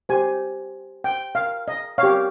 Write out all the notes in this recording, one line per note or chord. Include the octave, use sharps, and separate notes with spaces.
G4 C5 G#5
G5
F5
D#5
G4 C#5 F5